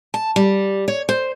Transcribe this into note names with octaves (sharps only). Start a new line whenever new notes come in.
A5
G3
C#5
C5